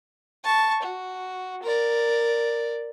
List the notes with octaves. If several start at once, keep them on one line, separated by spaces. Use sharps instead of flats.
A5 C#6
F#4
A#4 D5